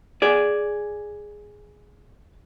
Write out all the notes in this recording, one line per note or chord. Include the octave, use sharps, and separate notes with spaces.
G#4 D5